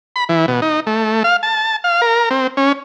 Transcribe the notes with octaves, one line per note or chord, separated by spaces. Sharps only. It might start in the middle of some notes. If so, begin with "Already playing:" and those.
B5
E3
B2
D#4
A3
F5
A5
F5
A#4
C4
C#4